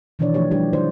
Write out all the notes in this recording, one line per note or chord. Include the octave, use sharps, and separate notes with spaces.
B2 D#3 E3 D4 C#5 D5
D#3 F3 A3 D4 G4 C#5
F#3 G3 D4 E4 G4
B2 D3 D#4 E4 C5 D5